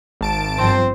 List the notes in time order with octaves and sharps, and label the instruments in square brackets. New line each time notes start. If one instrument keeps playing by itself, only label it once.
[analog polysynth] G#1 A5 D7
[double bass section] G1 F3 [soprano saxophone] C4 [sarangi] C5